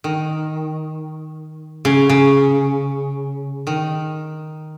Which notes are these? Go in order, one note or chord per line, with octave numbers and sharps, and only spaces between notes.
D#3
C#3
C#3
D#3